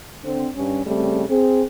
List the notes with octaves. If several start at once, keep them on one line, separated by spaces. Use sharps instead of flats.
D3 C4
G2 C#4
C#3 G3 A3 C4
C4 G#4